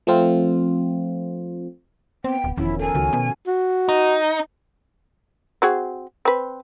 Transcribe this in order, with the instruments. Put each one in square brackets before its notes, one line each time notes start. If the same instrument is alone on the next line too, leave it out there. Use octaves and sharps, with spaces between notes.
[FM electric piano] F3 A3 C4 F4
[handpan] B3 [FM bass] C4 [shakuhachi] G5
[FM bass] D1
[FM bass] E1 [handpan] D#3 F3 C#4 [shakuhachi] E4
[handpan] A4 A#4 [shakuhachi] G#5
[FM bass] C#2 [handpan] D#3 C#4 F#4
[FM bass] B2
[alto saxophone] F#4
[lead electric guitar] D#4
[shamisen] C4 F#4 G#4
C4 B4